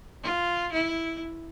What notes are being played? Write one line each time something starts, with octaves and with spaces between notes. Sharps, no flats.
F4
E4